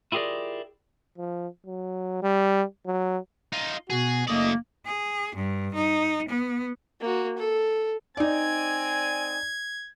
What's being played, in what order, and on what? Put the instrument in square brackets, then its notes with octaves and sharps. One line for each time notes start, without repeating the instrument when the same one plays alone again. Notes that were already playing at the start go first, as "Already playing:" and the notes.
[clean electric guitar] E4 F4 G4 G#4 A#4 D5
[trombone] F3
F#3
G3
F#3
[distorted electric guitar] D#4 F4
[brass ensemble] B2 F#4 [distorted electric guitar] G#4
[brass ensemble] F#1 D#5 [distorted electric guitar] A3 D5 [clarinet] A#3
[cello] G#4
G2
D#4
B3
[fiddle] A#3 F#4
A4
[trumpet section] C4 G#5 [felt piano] D#4 D5 [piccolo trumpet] G#6